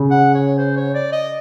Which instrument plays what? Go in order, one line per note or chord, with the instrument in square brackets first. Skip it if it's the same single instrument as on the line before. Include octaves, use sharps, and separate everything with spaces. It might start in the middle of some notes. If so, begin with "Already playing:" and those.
Already playing: [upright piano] C#3
[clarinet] F#5
C#5
C5
C#5
D5
D#5